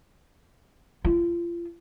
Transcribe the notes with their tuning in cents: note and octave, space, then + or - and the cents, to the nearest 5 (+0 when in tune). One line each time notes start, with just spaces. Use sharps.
F4 -35